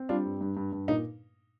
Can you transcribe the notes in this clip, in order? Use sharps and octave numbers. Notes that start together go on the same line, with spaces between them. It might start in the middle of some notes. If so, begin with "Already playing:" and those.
Already playing: C4
G3 D4 F4
G2
G2
G2
G2
A#2 D#4